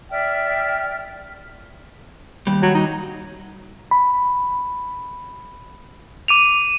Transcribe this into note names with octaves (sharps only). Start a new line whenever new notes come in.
D5 E5 G5 F6
D#2 G3
F#3
D#4
B5
D6 D#7 F7